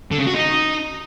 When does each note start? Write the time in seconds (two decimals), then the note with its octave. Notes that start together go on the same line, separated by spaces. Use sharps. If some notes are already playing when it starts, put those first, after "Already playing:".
0.12 D3
0.19 C#3
0.27 F#4
0.35 D#4